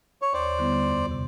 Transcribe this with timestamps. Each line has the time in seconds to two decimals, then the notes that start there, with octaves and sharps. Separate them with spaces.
0.22 C#5
0.34 D#2 C5 D5
0.59 D3 G3 B3 E4
0.86 F2
1.11 C3